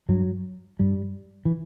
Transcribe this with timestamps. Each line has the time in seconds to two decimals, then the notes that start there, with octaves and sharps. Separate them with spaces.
0.09 G2 F#3
0.79 G2 G3
1.45 E3